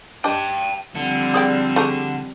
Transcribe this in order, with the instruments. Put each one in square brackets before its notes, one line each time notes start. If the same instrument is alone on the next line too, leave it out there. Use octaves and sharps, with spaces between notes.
[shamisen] D4 G4 D#5 [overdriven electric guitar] G5 A5
[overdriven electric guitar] D3 [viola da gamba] F3 G3 C4
[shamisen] G#4 D5 G5
A3 G4 G#4